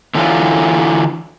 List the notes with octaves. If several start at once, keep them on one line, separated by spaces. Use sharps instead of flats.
D3 E3 F#3 F4